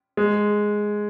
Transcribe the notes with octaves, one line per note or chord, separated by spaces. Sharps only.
G#3